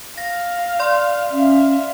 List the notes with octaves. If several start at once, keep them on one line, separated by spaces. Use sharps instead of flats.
F5 A#6
D5 C6
C#4 E5 F5